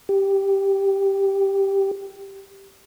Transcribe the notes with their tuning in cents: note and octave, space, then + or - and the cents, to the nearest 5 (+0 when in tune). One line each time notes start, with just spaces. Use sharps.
G4 +0